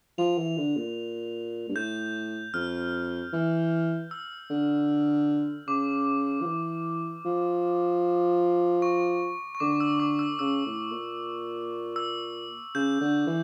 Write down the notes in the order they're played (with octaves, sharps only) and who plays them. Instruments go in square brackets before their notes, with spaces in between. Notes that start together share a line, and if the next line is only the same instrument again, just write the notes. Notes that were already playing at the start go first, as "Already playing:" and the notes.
[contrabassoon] F3 [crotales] F7
[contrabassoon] E3
D3
A#2
G2
[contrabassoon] A2 [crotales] G6
[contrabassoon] F2 [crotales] F6
[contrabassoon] E3
[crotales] E6
[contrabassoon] D3
[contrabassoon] C#3 [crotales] D6
[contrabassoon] F3
E3
F3
[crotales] C#6
C#6
[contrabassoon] D3 [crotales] D6
[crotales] E6
D6
E6
[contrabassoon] C#3 [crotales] E6
[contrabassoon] A2
A#2
[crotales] E6
[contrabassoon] C#3 [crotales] G6
[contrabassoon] D3
E3